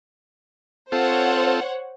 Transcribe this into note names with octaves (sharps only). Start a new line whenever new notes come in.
C4 F4 A4 C5 C#5 F#5